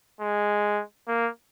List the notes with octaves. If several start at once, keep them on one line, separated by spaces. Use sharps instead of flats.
G#3
A#3